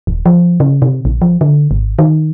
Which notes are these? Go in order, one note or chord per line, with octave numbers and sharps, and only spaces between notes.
D#1
F3
C#3
C3
A#1
F3
D3
G#1
D#3